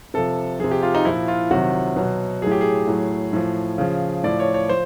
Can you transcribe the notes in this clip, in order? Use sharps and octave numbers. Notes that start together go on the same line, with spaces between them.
C3 F3 A4
C3 F3 G#4
G4
F4
D#4
A#2 F3 E4
F4
C3 D#3 F#3 F#4
B2 F#3
A2 F#3 G#4
G4
G#4
A2 F#3
A2 F3
C#3 F3
A2 F3 D5
C#5
C#5
F3 C5